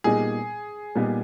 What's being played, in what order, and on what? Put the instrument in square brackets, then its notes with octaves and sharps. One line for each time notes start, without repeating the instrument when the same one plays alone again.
[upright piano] A#2 G3 B3 D#4 [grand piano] G#4
[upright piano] A#2 G3 B3 D#4